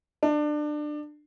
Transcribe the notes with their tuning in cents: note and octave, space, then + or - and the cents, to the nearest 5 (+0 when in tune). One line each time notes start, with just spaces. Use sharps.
D4 +25